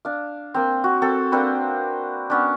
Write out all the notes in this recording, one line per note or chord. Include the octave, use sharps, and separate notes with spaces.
D4 F5
A#3 C4
F#4
C4 A4
A#3 C4 D4 B4
B3 C#4 D4